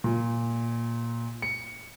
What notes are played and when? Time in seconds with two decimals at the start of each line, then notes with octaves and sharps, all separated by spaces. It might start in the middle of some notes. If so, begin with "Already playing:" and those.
0.04 A#2
1.42 C#7